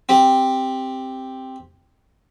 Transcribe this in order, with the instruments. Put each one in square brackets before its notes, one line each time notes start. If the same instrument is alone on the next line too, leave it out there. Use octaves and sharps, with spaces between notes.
[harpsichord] C4 G4